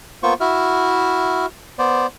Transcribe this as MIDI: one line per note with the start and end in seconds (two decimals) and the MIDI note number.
0.23 0.34 58
0.23 0.34 59
0.23 0.34 65
0.23 0.34 72
0.23 0.34 85
0.40 1.46 64
0.40 1.46 66
0.40 1.46 76
0.40 1.46 89
1.79 2.06 59
1.79 2.06 72
1.79 2.06 74